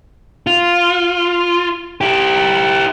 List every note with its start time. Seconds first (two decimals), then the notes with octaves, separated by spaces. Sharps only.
0.47 F4
2.01 E4 G4